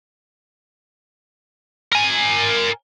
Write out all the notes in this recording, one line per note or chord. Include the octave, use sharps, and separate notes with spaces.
A#4 G#5